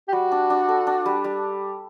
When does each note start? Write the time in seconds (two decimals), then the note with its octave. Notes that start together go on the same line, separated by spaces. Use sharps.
0.08 G4
0.13 G3 F#4
0.32 D4
0.50 D4
0.68 A4
0.87 D4
1.06 G3
1.24 G3